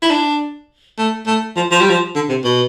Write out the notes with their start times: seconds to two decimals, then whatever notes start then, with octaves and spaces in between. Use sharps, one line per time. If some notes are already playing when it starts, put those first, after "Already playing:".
0.02 E4
0.11 D4
0.98 A3
1.27 A3
1.57 F3
1.71 F3
1.81 G3
1.90 F3
2.15 D3
2.29 C3
2.44 B2